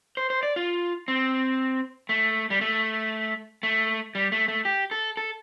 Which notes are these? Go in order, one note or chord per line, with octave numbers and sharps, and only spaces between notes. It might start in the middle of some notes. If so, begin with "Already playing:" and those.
C5
C5
D5
F4
C4
A3
G3
A3
A3
G3
A3
A3
G4
A4
A4